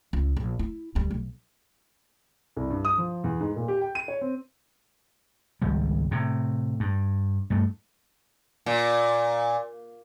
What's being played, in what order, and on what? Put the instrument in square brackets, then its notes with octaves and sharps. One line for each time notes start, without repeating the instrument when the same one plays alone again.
[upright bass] C#2
A#1
E4
D2 G3
B1
[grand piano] C2
G2
D#6
F3
E2
G#2
A#2
G4
G5
D#7
C#5
C4
[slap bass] G#1 C#2 G3
A2 C3
G2
G2 A3
[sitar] A#2